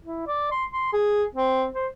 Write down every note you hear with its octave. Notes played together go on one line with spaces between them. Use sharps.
E4
D5
C6
C6
G#4
C4
C5